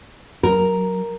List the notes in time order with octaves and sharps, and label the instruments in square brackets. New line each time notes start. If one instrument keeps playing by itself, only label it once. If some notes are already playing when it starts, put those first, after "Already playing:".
[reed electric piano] F#3 [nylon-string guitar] A#4